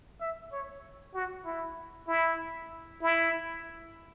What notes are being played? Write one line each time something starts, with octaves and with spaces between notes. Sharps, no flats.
E5
C#5
F#4
E4
E4
E4